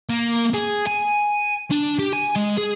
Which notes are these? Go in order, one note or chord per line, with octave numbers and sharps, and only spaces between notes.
A#3
G#4
G#5
D4
G4
G#5
G#3
G#4